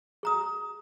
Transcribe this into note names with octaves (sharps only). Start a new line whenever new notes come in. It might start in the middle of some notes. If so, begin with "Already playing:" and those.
G#4 A#5 D#6